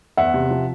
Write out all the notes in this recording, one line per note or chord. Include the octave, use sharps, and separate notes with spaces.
E2 E5 F#5
C3
F3